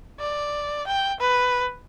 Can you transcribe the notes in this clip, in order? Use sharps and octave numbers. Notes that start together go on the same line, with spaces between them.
D5
G5
B4